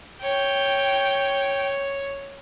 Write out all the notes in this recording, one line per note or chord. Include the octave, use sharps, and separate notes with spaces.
C#5 G5